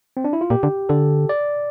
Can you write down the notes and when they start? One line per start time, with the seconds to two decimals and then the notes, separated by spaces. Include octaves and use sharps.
0.17 C4
0.25 D4
0.33 E4
0.41 F4
0.50 A#2 G4
0.63 D3
0.89 D3 A4
1.29 D5